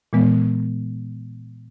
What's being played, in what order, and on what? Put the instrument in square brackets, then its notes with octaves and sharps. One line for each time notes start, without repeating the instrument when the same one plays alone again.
[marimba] A#2 E3 G#3 B3